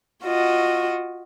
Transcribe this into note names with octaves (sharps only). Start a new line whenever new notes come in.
F4 F#4 D#5